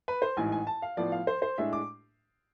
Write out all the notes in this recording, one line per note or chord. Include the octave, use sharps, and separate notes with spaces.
B4
C5
A1 G#2 E3 G#5
G#5
A5
F5
A2 F3 B3 D5
F5
C5
C5
A2 G#3 D4 E5
D6